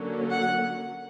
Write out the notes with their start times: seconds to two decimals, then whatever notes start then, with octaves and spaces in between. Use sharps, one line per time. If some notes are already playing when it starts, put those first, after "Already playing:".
Already playing: D3 F#3 A#3 C#4
0.31 F#5